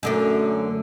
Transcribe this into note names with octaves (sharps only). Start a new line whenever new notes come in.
F#2 D3 A3